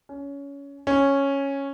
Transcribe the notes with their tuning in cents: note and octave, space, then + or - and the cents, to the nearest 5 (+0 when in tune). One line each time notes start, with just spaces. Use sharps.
C#4 +20
C#4 -5